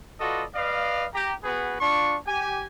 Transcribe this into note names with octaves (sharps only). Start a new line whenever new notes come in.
F4 F#4 A4 B4 D5 D#5
B4 D5 D#5 F5
G4 A#5
B3 F#4 G#4 B4
D4 F4 C#6
G4 G#5